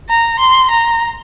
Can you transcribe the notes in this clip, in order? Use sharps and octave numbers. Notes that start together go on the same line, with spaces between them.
A#5
C6
A#5